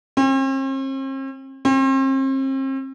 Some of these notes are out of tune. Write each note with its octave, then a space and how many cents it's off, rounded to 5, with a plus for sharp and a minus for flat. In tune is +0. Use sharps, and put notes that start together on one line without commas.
C4 +45
C4 +40